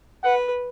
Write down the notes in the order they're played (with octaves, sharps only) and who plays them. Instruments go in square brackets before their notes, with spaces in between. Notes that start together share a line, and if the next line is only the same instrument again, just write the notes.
[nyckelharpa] B4 [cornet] F#5